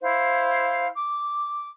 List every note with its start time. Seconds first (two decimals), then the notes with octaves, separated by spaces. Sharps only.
0.02 E4 C5 F5
0.94 D6